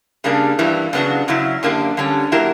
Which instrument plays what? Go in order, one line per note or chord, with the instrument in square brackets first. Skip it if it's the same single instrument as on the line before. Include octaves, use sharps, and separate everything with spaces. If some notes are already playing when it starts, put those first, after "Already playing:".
[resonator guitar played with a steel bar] C#3 G3 A#3 D4
G2 E3 G3 A#3 E4
C#3 F#3 B3 D4 F#4
F#2 C#3 F#3 C#4 E4
F#2 D3 A#3 D4 G4
D3 G3 C#4
F#3 A#3 E4 G4 A#4